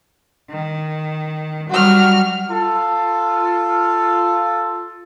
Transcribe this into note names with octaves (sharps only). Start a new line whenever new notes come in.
D#3
F#3 G3 F#4 F6
F4 A4